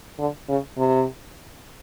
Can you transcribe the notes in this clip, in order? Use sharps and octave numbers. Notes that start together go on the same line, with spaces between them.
D3
C#3
C3